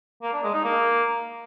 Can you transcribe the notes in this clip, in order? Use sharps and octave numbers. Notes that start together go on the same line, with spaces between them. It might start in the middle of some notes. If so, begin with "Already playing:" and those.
A#3
D4
G#3
D#4
A#3